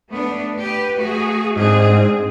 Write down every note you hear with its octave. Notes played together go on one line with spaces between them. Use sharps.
A3 B3 D4
G4 B4
A3 F#4 G#4
G#2 C4 D4 G#4